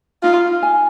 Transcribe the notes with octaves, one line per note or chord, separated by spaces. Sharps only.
D#4 F4
G#5